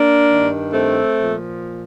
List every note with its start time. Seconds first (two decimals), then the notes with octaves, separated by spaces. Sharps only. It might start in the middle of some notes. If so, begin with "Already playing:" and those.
Already playing: A#3 D4
0.31 G2 D#3
0.73 A3 C4
1.17 A#2 F3